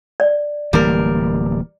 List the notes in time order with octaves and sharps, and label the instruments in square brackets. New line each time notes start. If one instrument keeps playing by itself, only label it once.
[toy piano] D5
[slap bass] D1 E3 A#3 [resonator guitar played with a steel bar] G3 A#4